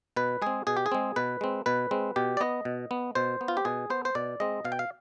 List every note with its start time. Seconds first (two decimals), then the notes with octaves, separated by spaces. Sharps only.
0.16 B2 B4
0.42 G#3 C4 G#4
0.67 B2 G#4
0.77 G4
0.86 G#4
0.92 G#3 C4
1.16 B2 B4
1.41 G#3 C4
1.66 B2 B4
1.91 G#3 C4
2.16 B2 G4
2.37 D5
2.41 B3 D#5
2.65 B2
2.91 B3
3.15 B2 C5
3.41 B3
3.48 F4
3.57 G4
3.65 B2 G#4
3.90 B3 C5
4.05 C5
4.15 B2 D5
4.40 G#3 C4 D#5
4.65 B2 F5
4.72 G5
4.79 F5